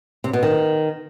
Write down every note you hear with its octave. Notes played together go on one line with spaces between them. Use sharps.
C3
B2
D#3